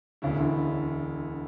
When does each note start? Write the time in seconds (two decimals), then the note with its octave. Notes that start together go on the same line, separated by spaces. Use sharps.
0.22 E1 D2 D3 C#4 E4